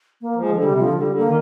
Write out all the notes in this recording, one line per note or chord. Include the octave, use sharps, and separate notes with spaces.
A#3
F3 G#3
D3
C3 G3
D3 F3
D3 G3
D3
D#3 A#3